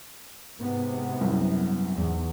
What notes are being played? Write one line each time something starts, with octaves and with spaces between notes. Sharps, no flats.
G#2 C3 B3
C2 F#2
E2 G#2